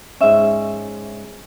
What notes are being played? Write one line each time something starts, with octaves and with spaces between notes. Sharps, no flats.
G#2 G#3 C#4 E5